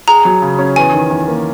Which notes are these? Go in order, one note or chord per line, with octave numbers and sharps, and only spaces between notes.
G#4 A#5
F#3
C#3
C#4
E2 G#5
D#3
E2
A#3